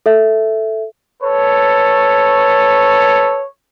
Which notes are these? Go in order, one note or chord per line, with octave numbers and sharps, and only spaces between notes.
A4 E5
A4 B4 C#5